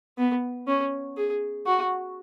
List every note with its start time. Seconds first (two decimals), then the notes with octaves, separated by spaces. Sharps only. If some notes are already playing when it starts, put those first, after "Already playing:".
0.18 B3
0.67 C#4
1.17 G#4
1.67 F#4